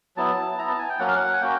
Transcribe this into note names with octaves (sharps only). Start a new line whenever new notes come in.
F#3 B3 E4 A5
B3 E4 A#5
A5
G#5
G5
F#3 A#3 C#4 F#5
F5
F#5
G#5
A#3 C#4 F#4 G5